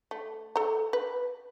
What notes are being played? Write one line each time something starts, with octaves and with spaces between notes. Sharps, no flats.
A3
A4 A#5
B4